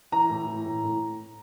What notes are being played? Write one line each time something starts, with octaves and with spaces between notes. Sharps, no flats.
E3 A#5
A2
E3
A2
A2